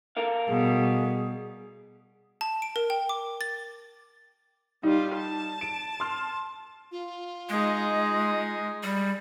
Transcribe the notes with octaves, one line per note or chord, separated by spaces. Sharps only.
A4 A#4 F5
B2 G3 G#4
A5
D7
A#4
G5
D6
A6
G3 D#4 F4
A5
D7
C6 F6
F4
G#3 D#4 G#4
G3